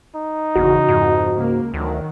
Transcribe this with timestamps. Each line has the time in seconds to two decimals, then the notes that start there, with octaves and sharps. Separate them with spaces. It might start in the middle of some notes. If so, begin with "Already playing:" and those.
0.16 D#4
0.56 G#1 E2 C#3 F#4
0.88 F2 G#2
1.34 C#2 A#3
1.74 D2 D#3 F#3